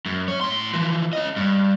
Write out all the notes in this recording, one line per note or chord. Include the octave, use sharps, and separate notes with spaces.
F#2
C#4 C#5
A2 C6
E3 F3
C#4 D#5
G2